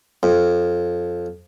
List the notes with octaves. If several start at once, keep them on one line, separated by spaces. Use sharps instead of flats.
F2